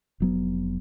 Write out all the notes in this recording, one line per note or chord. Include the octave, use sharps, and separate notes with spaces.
F1 F#3 B3